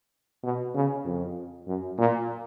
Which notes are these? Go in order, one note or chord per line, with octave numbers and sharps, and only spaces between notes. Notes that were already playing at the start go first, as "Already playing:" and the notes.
B2
C#3
F2
F#2
A#2